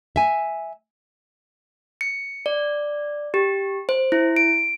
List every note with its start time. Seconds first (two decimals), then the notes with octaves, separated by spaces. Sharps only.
0.16 E5 G#5
2.01 C#7
2.46 D5
3.34 G4
3.89 C5
4.12 E4
4.36 D7